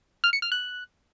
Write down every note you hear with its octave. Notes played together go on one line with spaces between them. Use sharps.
F6
C#7
F6
F#6